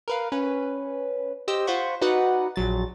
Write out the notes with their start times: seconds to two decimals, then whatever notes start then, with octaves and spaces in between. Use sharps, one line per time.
0.08 A#4 B4 F5
0.32 C#4 B4
1.48 G4 C5 D#5 E6
1.67 F4 C5 F#5 B5 C#6
2.01 D#4 F#4 B4 D5 D#5 F#5
2.56 A#1 F#3 A6